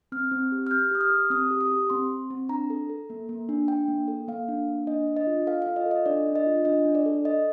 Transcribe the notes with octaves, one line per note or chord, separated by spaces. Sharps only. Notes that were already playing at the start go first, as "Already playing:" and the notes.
C4 F6
C4
G4
F6
G4 G6
G4 D#6
F6
G4
C4 D#6
G4
D#6
G4
C4 C6
C4
C4
D4 A#5
A4
A4
A#3
A#3
D4
D4 G5
A#3
A4
A#3 F5
D4
A#3
D4 D#5
D4
D#5
F4
A4 F5
F4 F5
D#5
A4
D#5
D4 D5
D4
D#5
F4
D4 D#5
D4
D5
A4
A4 D#5